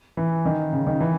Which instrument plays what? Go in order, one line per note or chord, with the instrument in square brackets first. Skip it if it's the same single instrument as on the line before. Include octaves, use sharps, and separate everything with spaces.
[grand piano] E3
D#3
C#3
D#3
E3